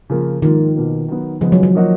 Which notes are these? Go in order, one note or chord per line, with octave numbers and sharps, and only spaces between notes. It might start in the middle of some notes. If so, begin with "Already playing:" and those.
C#3 F3 A#3 F4
G#2 D#3 F3 A#3 F4
B2 A#3 F4
D#3 F#3 B3
C#3 F3 G#3 B3
F#3
F#3
F3 A#3 D#4 F#4